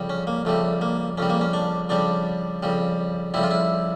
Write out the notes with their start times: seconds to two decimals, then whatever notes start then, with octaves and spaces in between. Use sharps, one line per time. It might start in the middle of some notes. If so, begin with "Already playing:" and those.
Already playing: F2 C#3 G3
0.10 C#4
0.27 A#3
0.45 F2 C#3 G3 A3
0.81 A#3
1.18 F2 C#3 G3 C#4
1.30 A#3
1.41 C#4
1.53 D4
1.89 F2 C#3 G3 D4
2.63 F2 C#3 G3
3.34 F2 C#3 G3 E4
3.43 F4
3.51 E4